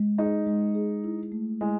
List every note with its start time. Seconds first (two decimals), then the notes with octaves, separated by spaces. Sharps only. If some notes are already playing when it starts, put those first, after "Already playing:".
Already playing: G#3
0.18 D#4 G#4
0.47 G#3
0.75 G#4
1.04 E4
1.32 A3
1.61 G#3 E4